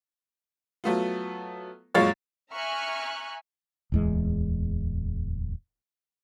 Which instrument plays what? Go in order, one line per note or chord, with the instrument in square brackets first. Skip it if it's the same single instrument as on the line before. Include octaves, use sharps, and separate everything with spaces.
[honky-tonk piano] F#3 A3 B3 F4
F#2 A#2 G#3 C#5 F5 A6
[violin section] E5 G#5 A#5 C#6 F6 F#6
[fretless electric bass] D1 E2 G#3